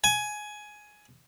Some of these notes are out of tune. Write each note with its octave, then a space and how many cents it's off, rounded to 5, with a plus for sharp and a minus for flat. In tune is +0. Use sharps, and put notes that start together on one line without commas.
G#5 +15